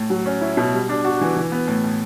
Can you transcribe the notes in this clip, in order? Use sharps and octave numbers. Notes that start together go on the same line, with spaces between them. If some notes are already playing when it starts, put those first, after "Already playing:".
Already playing: A2
F#3
C#4
E4
B2
G3
D4
F#4
E3
E3
B3
A2
A2